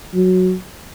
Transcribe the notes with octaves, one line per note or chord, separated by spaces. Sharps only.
F#3